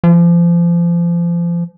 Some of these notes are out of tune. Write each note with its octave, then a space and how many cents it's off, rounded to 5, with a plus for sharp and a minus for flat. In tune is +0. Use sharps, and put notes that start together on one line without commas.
F3 -30